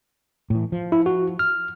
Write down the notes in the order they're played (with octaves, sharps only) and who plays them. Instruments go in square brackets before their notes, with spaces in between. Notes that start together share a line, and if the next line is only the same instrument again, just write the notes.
[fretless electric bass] A2 E3
F3
[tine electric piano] E4
F#4
F6